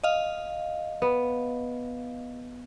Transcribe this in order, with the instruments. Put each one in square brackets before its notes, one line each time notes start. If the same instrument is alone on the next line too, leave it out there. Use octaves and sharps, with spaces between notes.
[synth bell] D#5 F5
[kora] B3